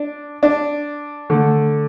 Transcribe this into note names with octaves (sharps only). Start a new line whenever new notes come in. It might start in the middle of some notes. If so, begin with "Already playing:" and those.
Already playing: D4
D4
D3 A3